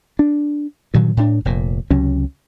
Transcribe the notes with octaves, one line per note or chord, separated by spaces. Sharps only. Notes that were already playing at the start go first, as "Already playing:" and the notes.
D4
G2 A#2 D#3 F#3
A2 D4
F1 A#2
C#2 C3 F#3 C#4